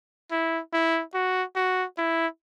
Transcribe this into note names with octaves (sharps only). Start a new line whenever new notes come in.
E4
E4
F#4
F#4
E4